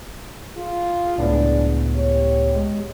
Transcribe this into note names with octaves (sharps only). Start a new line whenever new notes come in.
F4 G#4
C#2 A2 B3 D4
G4 C#5
G#3